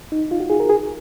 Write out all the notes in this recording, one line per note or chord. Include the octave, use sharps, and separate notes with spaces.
D#4
F4
F#4
G#4
A#4
G#4